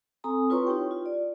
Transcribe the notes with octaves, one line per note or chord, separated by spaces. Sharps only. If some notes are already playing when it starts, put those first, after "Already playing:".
C4 A4 G#5 A#5 D#6
E4 F4 B4 C#5 C6 C#6
D#4 E4 G4 G5
F4
D5